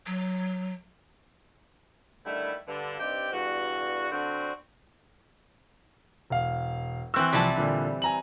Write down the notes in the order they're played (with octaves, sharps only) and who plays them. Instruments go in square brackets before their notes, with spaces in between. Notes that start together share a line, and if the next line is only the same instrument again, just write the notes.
[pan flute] F#3
[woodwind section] D3 D#3 G3 A3 E4
G2 D3
G2 C4 D#4 G4 D5 G5
E2 G2 G3 F#4
D3 C4 F#4
[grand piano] E1 F5
[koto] E3 C4 F#4 [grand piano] E6 F#6
[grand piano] C2 F3 [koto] G3 E4 A5
[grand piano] A#2 D3
G#5 A#5 F#7